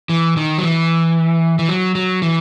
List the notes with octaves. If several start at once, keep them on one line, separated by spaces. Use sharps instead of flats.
E3
D#3
F#3
E3
E3
F#3
F#3
E3